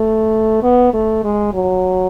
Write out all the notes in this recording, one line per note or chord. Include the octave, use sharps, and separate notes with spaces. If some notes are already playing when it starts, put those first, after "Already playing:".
Already playing: A3
B3
A3
G#3
F#3